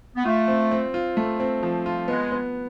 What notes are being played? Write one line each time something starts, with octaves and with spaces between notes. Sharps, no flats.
B3
A3 F4
C4
C4
F4
A3
C4
F3
F4
G#3 B3
B3